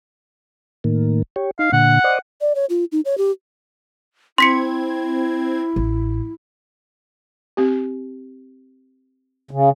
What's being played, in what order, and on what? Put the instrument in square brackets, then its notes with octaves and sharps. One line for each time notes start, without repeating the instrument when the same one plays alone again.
[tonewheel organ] A2 D#3 A#3
G4 C#5
[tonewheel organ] D#4 [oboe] F5
[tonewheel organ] A#2 D3 [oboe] F#5
[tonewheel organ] C5 D5 D#5
[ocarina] D5
C#5
F4
D#4
C#5
G4
[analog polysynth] C4 G#6 [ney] E4 [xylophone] C6 B6 C#7
[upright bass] A1
[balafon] C4 G4
[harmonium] C#3